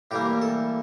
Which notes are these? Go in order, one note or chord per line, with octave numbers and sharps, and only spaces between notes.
A2 E3 G3 A#3 G4
A4